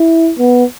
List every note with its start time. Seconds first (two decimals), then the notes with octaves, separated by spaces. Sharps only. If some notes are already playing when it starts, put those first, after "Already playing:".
Already playing: E4
0.38 B3